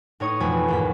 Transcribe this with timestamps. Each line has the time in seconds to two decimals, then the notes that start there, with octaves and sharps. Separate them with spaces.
0.20 A2 D#4 C#5 C#6 D#6
0.40 F2 B2 E3 A3 G#5 B5
0.68 D#2 G#2 B6